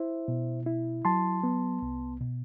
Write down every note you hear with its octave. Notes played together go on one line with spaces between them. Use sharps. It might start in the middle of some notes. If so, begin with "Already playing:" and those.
Already playing: E4 C5 E5
B2
E4
F#3 A5 C6
B3
C2
B2